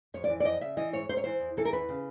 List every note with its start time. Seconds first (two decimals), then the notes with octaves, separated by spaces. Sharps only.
0.14 F2 C#5
0.24 D5
0.29 E3
0.40 D5
0.45 F2 D#5
0.61 C#3 E5
0.77 E3 D#5
0.93 G#2 C#5
1.09 G#2 C5
1.17 C#5
1.24 E3 C5
1.40 E2
1.57 E3 A4
1.65 A#4
1.73 E2 B4
1.89 C#3